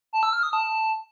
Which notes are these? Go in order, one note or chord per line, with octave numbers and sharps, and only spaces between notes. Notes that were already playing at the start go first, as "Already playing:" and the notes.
A5
E6
F6
D#6
A5